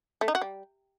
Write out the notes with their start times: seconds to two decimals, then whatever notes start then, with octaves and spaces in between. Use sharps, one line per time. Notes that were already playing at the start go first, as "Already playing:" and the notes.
0.21 A3
0.28 D#4
0.35 F#4
0.41 G3